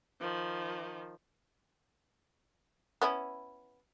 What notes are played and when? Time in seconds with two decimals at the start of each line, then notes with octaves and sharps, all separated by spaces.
0.20 D#3 F3
3.02 B3 C#4 E4